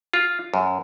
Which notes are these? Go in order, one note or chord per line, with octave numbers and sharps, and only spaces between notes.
F4
F#2